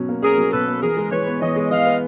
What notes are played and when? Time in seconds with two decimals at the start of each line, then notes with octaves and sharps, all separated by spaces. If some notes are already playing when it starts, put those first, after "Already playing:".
Already playing: B2 F#3 C#4
0.09 A#3
0.23 C#4 G#4 A#4
0.38 F#3
0.52 B2 A4 B4
0.68 A#3
0.82 E3 G#4 A#4
0.97 G#3
1.11 E3 B4 C#5
1.26 B3
1.41 E3 C#5 D#5
1.56 G#3
1.70 E3 D#5 F5
1.86 B3